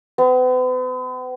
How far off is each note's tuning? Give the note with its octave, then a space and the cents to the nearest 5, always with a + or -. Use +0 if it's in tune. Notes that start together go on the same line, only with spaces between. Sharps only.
B3 +45